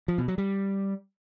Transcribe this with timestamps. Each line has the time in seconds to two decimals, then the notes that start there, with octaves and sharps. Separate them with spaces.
0.08 F3
0.18 B2
0.28 F#3
0.38 G3